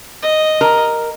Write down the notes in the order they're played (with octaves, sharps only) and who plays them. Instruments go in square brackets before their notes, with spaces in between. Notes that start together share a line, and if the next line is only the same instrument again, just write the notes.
[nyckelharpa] D#5
[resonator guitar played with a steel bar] A#4